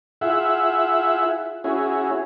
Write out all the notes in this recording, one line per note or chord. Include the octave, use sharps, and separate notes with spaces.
E4 F4 G#4 E5 F#5
C#4 E4 F#4 G#4